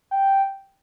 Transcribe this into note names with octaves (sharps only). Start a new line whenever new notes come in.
G5